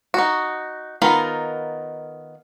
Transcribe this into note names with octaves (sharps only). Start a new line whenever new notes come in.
D#4 F#4
D#3 B3 D#4 F4 A#4